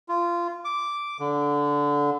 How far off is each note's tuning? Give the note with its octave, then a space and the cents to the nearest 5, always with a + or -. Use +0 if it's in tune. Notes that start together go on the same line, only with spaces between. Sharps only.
F4 -20
D6 -5
D3 -15